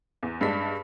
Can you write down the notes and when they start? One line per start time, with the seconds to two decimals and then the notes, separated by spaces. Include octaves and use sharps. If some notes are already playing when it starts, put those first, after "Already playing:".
0.23 E2
0.41 G2 G#3 D4 B6